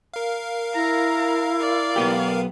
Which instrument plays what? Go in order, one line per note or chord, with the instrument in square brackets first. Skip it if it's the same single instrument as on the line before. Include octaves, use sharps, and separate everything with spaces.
[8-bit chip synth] A#4 F5
[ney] E4 [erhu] A#5
[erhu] D5
[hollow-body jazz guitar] B1 B3 G4